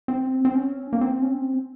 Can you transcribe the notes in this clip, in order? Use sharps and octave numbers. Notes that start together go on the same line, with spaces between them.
C4
C4
C#4
A#3
C4
C#4
C4